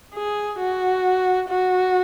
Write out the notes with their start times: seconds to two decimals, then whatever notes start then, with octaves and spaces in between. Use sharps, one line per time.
0.14 G#4
0.59 F#4
1.49 F#4